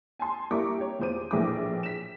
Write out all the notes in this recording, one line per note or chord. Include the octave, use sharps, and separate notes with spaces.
G#5 A5 C6
G3 A#3 E4 A#5 C#6 D6
G4 C#5
E2 F4 C5 D6 D#7
A#1 A2 E3 A#3 G#4 D6
B6 E7